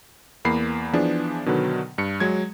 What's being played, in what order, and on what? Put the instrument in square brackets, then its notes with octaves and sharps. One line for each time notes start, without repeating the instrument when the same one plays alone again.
[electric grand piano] E2 A#3 B5 C7
E3 F3 B3 D4 G#4
B2 D3 D#3 F#3 B4
G2 C#7
F#3 G#3 G#6